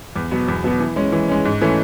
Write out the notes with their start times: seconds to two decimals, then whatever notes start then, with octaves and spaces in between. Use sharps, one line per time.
0.16 E2
0.31 B2 F#3 B3 F#4
0.48 E2
0.64 B2 F#3 B3 F#4
0.80 E3
0.96 G#3 C#4
1.12 E3
1.28 G#3 C#4
1.45 G#2
1.61 E3 A3 C#4